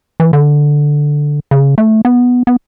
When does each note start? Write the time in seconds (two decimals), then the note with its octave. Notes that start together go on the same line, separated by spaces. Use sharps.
0.20 E3
0.33 D3
1.51 C#3
1.78 A3
2.05 B3
2.47 B3